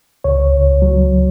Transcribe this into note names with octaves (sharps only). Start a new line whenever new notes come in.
C#2 C#5
C#2
F#3